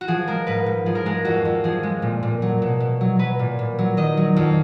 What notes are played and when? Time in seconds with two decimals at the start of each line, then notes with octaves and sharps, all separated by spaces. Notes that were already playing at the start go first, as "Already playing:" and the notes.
0.01 F#4
0.08 F3 G#4
0.28 G#3 A#4
0.47 G#2 B4
0.66 G#2
0.86 F3 G#4
0.95 A#4
1.06 G#3 G#4
1.25 F2 F#4
1.45 F2
1.64 F3 G#4
1.83 G#3
2.02 A#2
2.23 A#2
2.42 F#3
2.62 B2
2.80 B2
3.01 F#3
3.19 F#3 B4
3.39 A#2
3.59 A#2
3.79 F#3
3.97 D#3 D#5
4.17 F#3
4.36 F2